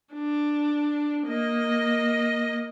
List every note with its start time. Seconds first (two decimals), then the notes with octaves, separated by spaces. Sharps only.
0.14 D4
1.26 A#3 D#5